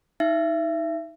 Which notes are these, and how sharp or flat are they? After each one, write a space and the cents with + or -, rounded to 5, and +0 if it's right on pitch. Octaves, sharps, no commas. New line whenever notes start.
D#4 +20 E5 +30